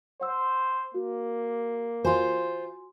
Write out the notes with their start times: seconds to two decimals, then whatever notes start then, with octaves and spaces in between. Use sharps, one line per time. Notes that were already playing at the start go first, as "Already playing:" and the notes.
0.21 C5 F#5 E6
0.94 A#3 F#4
2.05 F4 F#4 C5 G#5 C6